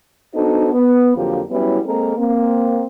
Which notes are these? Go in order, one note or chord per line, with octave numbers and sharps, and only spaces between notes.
B3 D4 D#4 F#4 A4 C5
B3
F2 D3 F3 F#3 A#3 G4
F#3 G3 B3 C#4 E4
G#3 A#3 C4 A4 A#4
A#3 C4